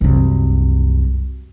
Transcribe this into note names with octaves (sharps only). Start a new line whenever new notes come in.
C2 F#2